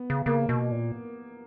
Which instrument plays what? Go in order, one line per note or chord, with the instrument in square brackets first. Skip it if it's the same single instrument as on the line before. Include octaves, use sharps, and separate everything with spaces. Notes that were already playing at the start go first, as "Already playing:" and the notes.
Already playing: [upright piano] B3
[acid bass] C#3
[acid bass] C#3 [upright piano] A#3
[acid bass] B2
A#2